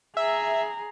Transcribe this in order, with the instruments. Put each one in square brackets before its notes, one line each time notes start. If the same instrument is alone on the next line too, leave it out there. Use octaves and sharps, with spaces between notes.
[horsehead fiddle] G#4 A#5 [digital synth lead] E5